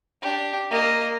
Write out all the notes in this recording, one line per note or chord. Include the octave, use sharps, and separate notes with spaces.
D4 G4
A#3 D#5